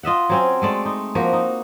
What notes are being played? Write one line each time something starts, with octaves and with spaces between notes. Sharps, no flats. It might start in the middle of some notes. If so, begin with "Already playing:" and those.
F4 D#5 E5 F#5
F#3 C4 C#4
G#3 A3 D5
D#4
F3 A#3 F#4 A#4
D#4